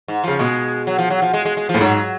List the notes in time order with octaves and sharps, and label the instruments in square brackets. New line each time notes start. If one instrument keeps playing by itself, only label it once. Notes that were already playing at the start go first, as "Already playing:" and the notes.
[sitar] G#2
[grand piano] C#3 [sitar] F3
[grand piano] B2 [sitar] G#3
[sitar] F#3
F3
F#3
F3
G#3
G#3
G#3
F3
[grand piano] A2
[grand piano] G#2 [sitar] F#3